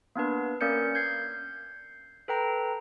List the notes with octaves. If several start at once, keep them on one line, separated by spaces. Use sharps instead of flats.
A#3 B3 D4 B4
A#3 C#4 A#4 D5 G6 C#7
G6 G#6 C7
A4 B4 G5 A#5